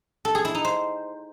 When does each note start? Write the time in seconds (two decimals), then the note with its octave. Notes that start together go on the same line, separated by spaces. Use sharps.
0.25 A4
0.35 G#4
0.45 E4
0.55 D#4
0.65 C5